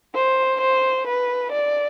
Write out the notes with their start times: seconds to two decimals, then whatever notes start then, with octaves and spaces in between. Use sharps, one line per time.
0.15 C5
0.61 C5
1.07 B4
1.52 D5